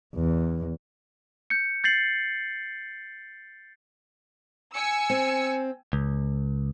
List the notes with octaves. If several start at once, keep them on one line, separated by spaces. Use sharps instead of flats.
E2
G6 C#7
G6 A6 C7 F#7
G#5 E6 C#7
C4
C#2